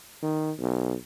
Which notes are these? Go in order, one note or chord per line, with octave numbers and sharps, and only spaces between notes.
D#3
B1